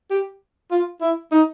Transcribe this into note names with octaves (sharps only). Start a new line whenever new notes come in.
G4
F4
E4
D#4